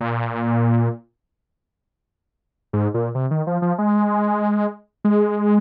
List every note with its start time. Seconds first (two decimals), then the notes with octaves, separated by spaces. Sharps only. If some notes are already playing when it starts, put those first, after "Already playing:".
0.01 A#2
2.73 G#2
2.94 A#2
3.15 C3
3.31 D#3
3.47 F3
3.62 F3
3.78 G#3
5.04 G#3